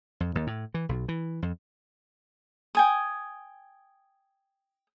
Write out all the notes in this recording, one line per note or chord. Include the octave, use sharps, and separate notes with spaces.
F2
D#2
A2
E3
B1
E3
F2
G5 G#5 D#6